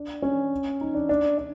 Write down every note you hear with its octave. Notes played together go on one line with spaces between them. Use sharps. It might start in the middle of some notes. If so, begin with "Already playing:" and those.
Already playing: D4
C#4
D#4
D4
D4
D4